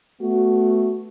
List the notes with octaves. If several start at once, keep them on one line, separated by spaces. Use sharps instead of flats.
A3 B3 F#4